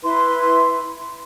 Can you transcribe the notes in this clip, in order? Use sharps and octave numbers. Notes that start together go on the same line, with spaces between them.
E4 B4 C6